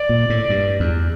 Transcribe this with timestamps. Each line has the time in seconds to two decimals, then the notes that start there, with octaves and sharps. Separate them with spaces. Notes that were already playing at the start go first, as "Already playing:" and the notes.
Already playing: D5
0.09 A#2
0.30 A2
0.50 G2
0.80 E2